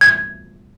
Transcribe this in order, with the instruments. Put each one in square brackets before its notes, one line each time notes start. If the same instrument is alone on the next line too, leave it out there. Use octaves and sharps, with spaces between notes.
[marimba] G#6